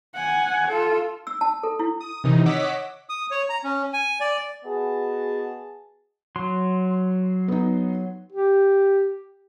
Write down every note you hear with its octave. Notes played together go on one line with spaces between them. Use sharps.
F#5 G#5
F4 A4
E6
A5
A4
E4
D#6
C3 D#3 E3 D#4
C#5 D#5 F#5 D6 E6 B6
D#6
C#5
A#5
C#4
G#5
D5
B3 F#4 G#4 D#5 A5
F#3 C6
B3 D#4
G4